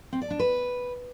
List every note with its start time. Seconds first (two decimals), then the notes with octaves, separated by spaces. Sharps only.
0.13 C4
0.21 D5
0.30 D4
0.39 B4